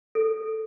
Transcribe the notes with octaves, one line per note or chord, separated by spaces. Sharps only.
A4